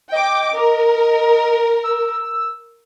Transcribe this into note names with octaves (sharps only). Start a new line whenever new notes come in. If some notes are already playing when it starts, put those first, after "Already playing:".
D#5 G5 D6
A#4
E6